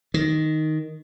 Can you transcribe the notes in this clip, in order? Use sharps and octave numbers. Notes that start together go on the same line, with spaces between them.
D#3